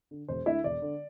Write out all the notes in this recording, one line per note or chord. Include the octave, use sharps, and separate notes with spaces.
D3
E1 C5
D2 D3 E4 E5
E1 D5
D3